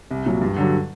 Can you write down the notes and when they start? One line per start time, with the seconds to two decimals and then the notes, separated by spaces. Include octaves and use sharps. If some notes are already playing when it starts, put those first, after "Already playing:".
0.11 C2
0.26 A#2 F#3
0.42 G2
0.56 D3 F#3